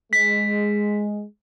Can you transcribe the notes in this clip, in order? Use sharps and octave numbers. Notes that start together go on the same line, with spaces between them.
G#3 B6